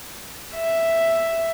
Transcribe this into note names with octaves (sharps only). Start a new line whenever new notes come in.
E5